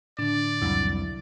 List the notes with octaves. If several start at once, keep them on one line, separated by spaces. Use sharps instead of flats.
A2 D3 D4 D5
C2 F2 F#3 E4